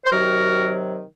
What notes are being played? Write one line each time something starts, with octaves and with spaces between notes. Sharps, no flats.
C5
C3 D#3 F#3 F#4 A#4